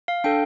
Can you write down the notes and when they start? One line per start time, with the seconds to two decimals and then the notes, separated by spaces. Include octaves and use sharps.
0.08 F5
0.24 D4 A4 G5